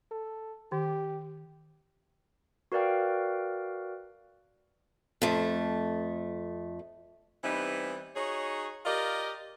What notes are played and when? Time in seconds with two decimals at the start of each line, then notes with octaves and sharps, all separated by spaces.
0.11 A4
0.72 D#3 G4
2.72 F#4 A#4 B4 D5 F5 G5
5.22 F2 A3
7.43 E3 G3 B3 C4 D#4
8.16 D#4 F#4 G#4 C#5
8.86 F4 G4 A#4 D5 D#5